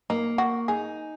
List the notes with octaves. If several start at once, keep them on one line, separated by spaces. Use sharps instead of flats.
A#3 D#4
F#4
D#4 G#4